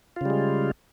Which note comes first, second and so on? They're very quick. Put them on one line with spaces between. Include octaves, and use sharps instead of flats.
F4 C#3 G3 G#3